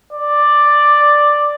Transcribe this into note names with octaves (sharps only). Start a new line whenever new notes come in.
D5